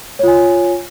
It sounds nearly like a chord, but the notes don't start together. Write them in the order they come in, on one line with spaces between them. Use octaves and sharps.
C#5 F4 G#5